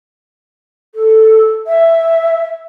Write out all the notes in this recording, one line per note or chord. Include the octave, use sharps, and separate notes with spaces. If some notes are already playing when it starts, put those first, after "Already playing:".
A4
E5